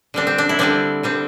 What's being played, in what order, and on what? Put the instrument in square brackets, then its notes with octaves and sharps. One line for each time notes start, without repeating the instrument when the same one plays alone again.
[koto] D3 G3 C4 D4
C4
D4
E4
D3 G3 C4 D4
D3 G3 C4